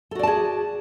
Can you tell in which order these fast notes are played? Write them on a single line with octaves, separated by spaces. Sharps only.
A4 F#4 D5 A5 G#4